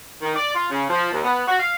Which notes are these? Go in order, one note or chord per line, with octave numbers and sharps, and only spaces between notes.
D#3
D5
F4
C#3
F3
D#2
B3
F#4
F5